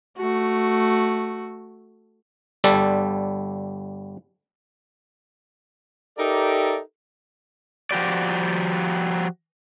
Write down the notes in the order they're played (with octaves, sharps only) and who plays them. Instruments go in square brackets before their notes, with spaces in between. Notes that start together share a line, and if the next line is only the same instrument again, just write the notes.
[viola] A3 F#4
[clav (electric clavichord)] G1 G3 A4 D5
[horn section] D#4 G4 A4 A#4 D5 E5
[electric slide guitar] F3 F#4 G4 D5